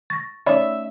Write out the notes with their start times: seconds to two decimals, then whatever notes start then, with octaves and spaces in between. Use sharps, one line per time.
0.10 C#6 A6 A#6
0.46 A3 C#4 D#4 C#5 D5 E5 B5